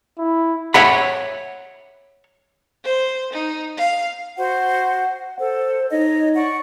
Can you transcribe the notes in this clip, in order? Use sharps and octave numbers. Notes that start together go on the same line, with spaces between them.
E4
C#5 E5 F#5 B5
C5
D#4
F5
F#4 C5 F#5
A4 C5
D#4 C#5 D#5
D5 F#5 C#6